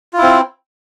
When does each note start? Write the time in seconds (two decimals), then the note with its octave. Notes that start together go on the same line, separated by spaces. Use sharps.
0.13 F4
0.18 E4
0.22 C4